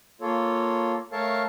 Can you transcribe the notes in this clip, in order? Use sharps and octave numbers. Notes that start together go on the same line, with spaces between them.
A#3 F4 A4 C#5
A3 A4 A#4 C#5 F5 A5